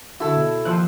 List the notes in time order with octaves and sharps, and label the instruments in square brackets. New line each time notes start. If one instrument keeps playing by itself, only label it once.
[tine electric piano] D3 F#4 [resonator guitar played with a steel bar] E4 A4
[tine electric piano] B2
[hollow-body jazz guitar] D#2 D#3 F3 [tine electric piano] C6 E6 F#6